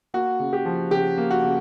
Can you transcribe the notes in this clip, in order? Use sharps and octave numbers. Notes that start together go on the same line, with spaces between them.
A#3 F#4
C#3
G4
F3
C#3 G4
A#3
F#4
C#3